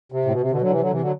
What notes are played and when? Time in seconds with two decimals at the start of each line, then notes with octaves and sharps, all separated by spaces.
0.12 C3
0.25 A2
0.31 B2
0.41 C3
0.51 B2 D3
0.61 D3 F#3
0.71 C3 E3
0.81 D3 F#3
0.91 C3 E3
1.01 D3 F#3